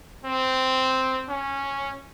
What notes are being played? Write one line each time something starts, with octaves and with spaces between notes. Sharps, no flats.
C4
C#4